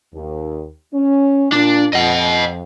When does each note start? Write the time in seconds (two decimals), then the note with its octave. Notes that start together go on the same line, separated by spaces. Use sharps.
0.14 D#2
0.94 C#4
1.52 A#2 D4
1.93 F2 D#5 F#5